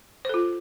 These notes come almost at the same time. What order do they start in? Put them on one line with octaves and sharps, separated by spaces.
C5 A4 F4